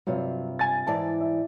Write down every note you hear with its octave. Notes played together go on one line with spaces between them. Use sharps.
G2 C3 F#3 F4
G#5 A6
G#2 E3 D5 A5
E5